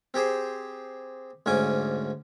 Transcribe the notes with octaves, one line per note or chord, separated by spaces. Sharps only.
C4 G4 G#4 C5
D2 G#2 C#4 G#5 D6